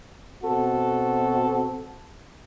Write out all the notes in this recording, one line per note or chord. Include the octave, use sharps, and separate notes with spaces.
B2 C4 F#4 A4